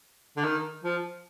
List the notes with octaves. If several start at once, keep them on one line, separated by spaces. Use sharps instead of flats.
D3
D#3
F3